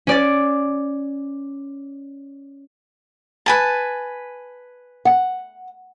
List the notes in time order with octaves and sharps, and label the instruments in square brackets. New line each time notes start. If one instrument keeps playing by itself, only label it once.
[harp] C#4 D5 A6
[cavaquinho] B4 G#5 A5
[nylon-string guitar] F#5